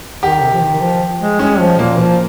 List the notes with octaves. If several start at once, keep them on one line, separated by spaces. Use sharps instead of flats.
D#3 G4
C3
F3
D#3
F3
G#3
G#3 C#4
F3
A#2 A#3
F3